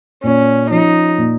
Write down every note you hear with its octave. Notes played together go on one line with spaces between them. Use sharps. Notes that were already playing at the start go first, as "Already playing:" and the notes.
A#2 C#4
F3 C#4 D#4
A#2